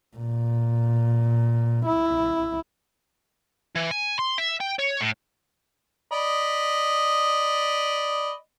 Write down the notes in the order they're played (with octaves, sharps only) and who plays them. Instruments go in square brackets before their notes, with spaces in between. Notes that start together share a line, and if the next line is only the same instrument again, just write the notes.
[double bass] A#2
E4
[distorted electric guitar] E3
G#5
C6
E5
G5
C#5
A2
[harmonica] D5 D#5 B5